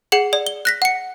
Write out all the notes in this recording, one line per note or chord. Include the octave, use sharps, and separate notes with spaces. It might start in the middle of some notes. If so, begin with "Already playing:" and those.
G#4 F#5 C#7 F#7
D5
G7
F#6 A#6 B6
F#5 C#7